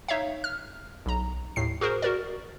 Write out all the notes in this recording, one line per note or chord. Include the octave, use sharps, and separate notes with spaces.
D#4 C#5 E5 F5
F6
B1 A#5
D#2 A2 C7
F#4 G#4 A#4 C5
F#4 A#4 D5